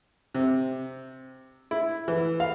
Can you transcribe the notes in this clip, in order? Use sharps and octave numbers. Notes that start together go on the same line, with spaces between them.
C3
E4
E3
F5